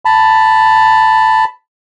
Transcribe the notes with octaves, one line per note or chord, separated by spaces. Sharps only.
A5 B5